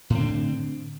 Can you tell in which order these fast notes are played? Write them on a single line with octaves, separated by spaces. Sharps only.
A2 C4 D3